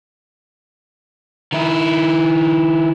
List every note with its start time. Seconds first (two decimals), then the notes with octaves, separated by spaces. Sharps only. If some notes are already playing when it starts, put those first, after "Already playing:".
1.52 D#3 E4